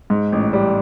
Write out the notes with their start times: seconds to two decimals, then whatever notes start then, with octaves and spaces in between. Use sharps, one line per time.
0.10 G#2
0.32 A1
0.53 G3